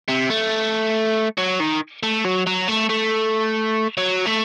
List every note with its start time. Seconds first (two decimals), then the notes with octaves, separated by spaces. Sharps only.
0.09 C3
0.30 A3
1.38 F#3
1.60 D#3
2.03 A3
2.25 F#3
2.46 F#3
2.68 A3
2.90 A3
3.98 F#3
4.26 A3